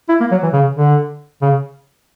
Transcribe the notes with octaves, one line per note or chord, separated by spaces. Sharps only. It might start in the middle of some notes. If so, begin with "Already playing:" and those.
E4
A#3
F#3
E3
C#3
D3
C#3